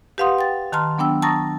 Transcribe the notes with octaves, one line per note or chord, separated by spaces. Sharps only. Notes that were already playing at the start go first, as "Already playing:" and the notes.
G4 B4 F5 F#5 C6 D#6
G5 A6
D#3 A5 A#5 C6 F6
F#3 B3 D4 G5 E6
A5 A#5 C#6 D#6 A6 A#6